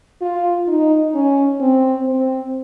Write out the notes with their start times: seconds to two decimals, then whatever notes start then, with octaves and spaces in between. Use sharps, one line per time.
0.22 F4
0.68 D#4
1.14 C#4
1.60 C4
2.06 C4